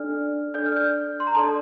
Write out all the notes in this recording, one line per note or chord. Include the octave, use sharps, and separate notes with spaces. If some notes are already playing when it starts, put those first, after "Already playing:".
Already playing: D4 A4 D5 F6
D4 A4 D5 G6
F6
G6
C6
A#5
D4 A4 D5 A5